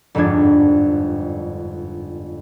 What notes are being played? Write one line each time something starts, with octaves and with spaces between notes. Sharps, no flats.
G1 F2 G#2 G3 D4 G#6